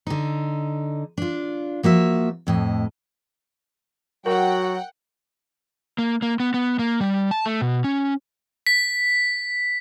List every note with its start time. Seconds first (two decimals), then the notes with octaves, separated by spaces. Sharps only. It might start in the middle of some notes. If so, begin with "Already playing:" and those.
0.07 D3 D#4
1.18 D4 F4
1.83 F3 A#3 F#4 E5
2.47 F2 A2 D#5
4.26 F#3 F#4 A#4 F#5 G5
5.98 A#3
6.22 A#3
6.40 B3
6.54 B3
6.79 A#3
7.00 G3
7.31 A5
7.46 A3
7.61 B2
7.84 C#4
8.67 B6